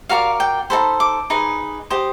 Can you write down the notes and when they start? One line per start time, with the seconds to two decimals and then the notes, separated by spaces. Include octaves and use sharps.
0.09 F#4 A#4 D5 F5
0.40 G5
0.70 D#4 F#4 A4 C5 B5
1.00 D6
1.30 D#4 G#4 B4
1.90 G4 C5 D#5